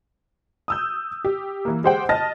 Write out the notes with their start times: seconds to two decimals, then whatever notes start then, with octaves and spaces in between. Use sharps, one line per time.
0.68 D#6 E6 G6
1.25 G4
1.65 E3 A#3
1.84 G#3 G4 C5 F#5 G5
2.09 D#5 A5 F6 A6 A#6